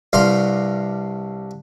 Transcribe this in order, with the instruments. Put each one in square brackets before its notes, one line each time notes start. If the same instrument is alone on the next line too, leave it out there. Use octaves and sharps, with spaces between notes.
[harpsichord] C2 G2 F5 C6